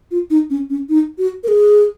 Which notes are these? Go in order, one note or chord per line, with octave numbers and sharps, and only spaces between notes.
F4
D#4
C#4
C#4
D#4
F#4
A#4
G#4